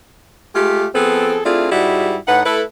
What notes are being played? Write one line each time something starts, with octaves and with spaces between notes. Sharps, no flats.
G#3 A3 F4 G4
F3 B3 C4 G#4 A4
A3 C4 D4 E4 F4 G#4
G#2 G3 G#3 E4 F#4
A2 D#4 B4 F#5
A3 E4 A4 B4